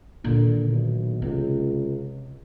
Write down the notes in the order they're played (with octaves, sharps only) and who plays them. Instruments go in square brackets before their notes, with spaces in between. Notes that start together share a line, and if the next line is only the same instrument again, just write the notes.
[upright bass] A#2 D#3 [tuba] D3
[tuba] B1
[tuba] C#2 [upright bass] C3